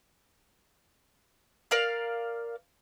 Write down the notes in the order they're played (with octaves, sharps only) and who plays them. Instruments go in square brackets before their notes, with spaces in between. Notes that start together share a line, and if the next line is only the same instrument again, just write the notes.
[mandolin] A#4 D5 F5